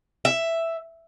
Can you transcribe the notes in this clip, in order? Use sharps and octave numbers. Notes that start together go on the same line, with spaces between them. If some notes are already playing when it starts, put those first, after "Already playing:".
E5